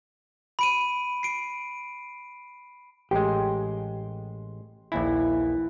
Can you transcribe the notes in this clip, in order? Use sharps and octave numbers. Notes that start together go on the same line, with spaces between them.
B5 D7 D#7
C7 D7
A1 G#3 G4 C6
A#1 D#2 E3 E4